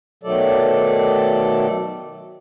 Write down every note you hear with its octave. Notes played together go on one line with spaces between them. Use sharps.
B2 D#3 F#3 A3 A4 D5